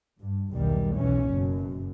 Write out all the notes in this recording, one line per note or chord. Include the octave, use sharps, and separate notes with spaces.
G2
B1 E2 D#3 G3
B1 E3 C#4
F#1 F#2 B2